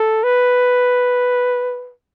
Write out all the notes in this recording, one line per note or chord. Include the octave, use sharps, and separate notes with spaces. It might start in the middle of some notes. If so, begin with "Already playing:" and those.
Already playing: A4
B4